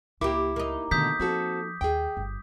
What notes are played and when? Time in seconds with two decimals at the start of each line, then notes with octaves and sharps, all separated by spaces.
0.21 C#2 A#3 E4 G4 D6
0.56 A#3 D#4
0.91 B2 D3 D#3 A3 D#6 G6 B6
1.20 F3 C4 F#4 A4
1.81 D#2 G#4 G5
2.17 G1